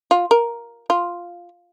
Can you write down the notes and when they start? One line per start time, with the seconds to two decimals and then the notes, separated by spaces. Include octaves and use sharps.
0.11 F4
0.31 A#4
0.90 F4